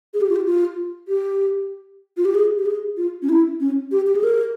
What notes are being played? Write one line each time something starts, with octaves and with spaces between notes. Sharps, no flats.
G#4
G4
F4
G4
F4
G4
F4
G4
G#4
G4
G#4
F4
C#4
E4
C#4
G4
G4
G#4
A#4